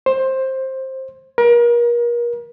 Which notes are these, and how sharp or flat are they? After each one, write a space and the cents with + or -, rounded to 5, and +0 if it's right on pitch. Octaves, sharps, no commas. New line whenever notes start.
C5 +15
A#4 +35